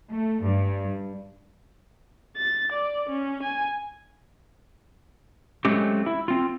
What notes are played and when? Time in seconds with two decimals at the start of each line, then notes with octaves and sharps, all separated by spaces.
0.10 A3
0.42 G2
2.37 A6
2.72 D5
3.10 C#4
3.43 G#5
5.65 F#3 G#3 A3 C4 C#4 G4
6.06 E4
6.28 C4 F4